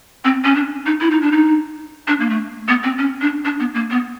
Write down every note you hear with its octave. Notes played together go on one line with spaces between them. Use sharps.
C4
C#4
D4
D#4
E4
D#4
D4
D#4
D4
A#3
A3
B3
C4
C#4
D4
D4
B3
A#3
B3